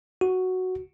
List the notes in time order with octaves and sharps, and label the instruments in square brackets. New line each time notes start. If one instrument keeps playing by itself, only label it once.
[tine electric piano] F#4